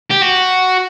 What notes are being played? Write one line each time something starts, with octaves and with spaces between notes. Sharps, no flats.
G4
F#4